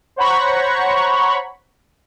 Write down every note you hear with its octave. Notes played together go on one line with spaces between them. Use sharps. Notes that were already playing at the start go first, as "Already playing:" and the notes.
C5 C#5 F#5 A#5 B5 C#6